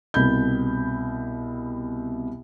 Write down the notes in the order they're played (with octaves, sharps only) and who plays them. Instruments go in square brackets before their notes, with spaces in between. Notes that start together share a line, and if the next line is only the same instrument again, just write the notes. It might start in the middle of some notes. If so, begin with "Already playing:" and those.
[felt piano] C2 B2 B5 G6